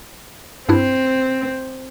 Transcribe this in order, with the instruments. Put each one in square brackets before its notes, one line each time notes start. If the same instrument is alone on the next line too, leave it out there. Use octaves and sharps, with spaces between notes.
[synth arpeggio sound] G2 D4 E4 [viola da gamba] C4